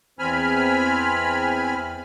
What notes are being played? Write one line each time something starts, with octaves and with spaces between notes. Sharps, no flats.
E2 C4 G#5 B5 F6